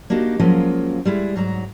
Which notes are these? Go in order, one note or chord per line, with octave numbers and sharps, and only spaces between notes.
A#3 D4 D#4 F#4 G4
F3 F#3 G#3 A#3 C#4 F4
G3 G#3 E4
G#2 F#3 F#4 A#5